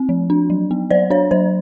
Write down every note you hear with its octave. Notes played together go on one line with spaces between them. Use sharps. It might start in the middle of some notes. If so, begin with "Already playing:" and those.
Already playing: C4
F3
D4
F#3
B3
F#3 C5 D5
D4 C#5
F#3 C5